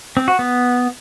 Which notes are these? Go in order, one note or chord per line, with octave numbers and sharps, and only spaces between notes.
C4
F#4
B3